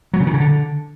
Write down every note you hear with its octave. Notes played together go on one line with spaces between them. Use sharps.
F#3
C#3
D#3
C#3
D3